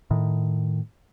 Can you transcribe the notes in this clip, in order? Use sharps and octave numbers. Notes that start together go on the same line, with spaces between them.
A2 D#3